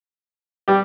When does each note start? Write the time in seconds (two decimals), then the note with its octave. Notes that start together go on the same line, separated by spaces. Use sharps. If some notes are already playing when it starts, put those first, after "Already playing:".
0.68 G3 G4